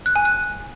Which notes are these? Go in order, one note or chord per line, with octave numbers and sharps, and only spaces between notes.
F#6
G#5
F#6